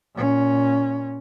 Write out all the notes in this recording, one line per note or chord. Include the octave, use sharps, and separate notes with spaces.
A#2 C#4